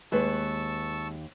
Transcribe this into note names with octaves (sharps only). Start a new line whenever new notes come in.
D#2 G#3 B4 A5 C#6 E6